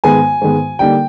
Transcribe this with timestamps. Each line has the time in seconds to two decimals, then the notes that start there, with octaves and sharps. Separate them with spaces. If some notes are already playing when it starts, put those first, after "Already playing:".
0.04 G#2 D#3 G#3 B3 G#5
0.41 G#2 D#3 G#3 B3
0.79 D3 G3 A#3 D#4 G5